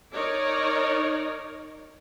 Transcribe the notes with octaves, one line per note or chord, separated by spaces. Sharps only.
D#4 A#4 C#5 D5